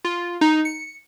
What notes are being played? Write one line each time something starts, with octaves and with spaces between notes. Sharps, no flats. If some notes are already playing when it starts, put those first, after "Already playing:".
F4
D#4
C#7